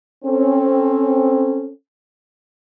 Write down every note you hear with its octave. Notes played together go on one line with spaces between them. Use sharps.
C4 C#4 A4